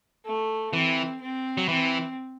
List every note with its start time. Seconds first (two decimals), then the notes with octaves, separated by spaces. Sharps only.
0.25 A3
0.73 E3 C4
1.21 C4
1.58 F#3
1.69 E3 C4